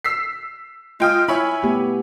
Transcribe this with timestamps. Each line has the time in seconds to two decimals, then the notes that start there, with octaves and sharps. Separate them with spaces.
0.04 E6 B6 C7
1.00 G#3 F4 G5 D#6
1.28 E4 C#5 E5 G#5 B5
1.63 A3 B3 G4